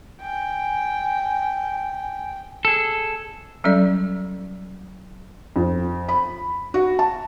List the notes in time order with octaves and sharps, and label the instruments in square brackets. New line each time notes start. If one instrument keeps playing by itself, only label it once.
[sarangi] G5 [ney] G#5
[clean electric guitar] G#4 A4
[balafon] F#3 G3 C#4 A4 D5
[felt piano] F2
B5
F#4
A5